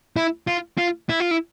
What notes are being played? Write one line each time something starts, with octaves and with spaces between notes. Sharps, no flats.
E4
F4
F4
E4
F4
E4